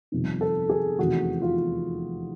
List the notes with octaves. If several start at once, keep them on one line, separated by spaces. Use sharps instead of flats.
G1 F2 C3 D#3
A4
G#4
F1 E2 C3 D#3 F#4
F4